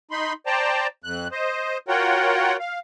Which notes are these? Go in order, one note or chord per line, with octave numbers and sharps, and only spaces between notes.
D#4 B5 C6
C5 D5 G5 A5 A#5
F2 F#6
C5 D#5
F4 F#4 A#4 C#5 F#5 G5
F5